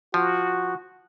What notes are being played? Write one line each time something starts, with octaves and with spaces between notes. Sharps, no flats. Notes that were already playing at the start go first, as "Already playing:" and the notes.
F3 F#4